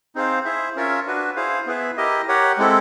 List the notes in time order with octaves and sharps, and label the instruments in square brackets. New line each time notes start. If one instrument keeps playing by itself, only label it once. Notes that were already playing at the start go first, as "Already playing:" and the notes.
[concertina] C4 D#4 G#4 C5 F5
E4 G#4 C5 E5
C#4 F4 A#4 C#5 E5
D4 F#4 B4
E4 G#4 C5 F5
B3 E4 G#4 B4 E5
E4 G4 A#4 D#5
G4 A#4 C#5 F#5
G#3 C4 E4 A4